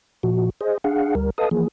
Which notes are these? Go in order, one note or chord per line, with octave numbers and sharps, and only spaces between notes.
A#2 F3 F#4
G#4 C5 D#5
D4 G#4 F5 F#5
D2 G3 A#4
A4 B4 D#5 F5 A5 D#6
E3 F3 A#3 G#4